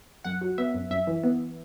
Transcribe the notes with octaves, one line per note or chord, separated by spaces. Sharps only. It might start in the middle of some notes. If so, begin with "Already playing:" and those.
F#2 F#5
F#3
B3 E5
F#2
F#2 E5
E3
B3